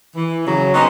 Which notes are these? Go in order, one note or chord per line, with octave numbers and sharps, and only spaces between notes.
E3
C#3 F#3
B3 C#4 D#4 C5